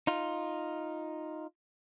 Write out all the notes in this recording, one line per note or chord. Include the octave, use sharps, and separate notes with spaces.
D#4 F4